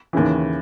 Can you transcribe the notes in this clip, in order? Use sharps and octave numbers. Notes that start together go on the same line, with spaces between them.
D#2 C#3 E3